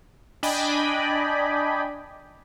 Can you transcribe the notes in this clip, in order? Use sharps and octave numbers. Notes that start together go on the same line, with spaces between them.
D4 D5 D#5 G5 G#5 B5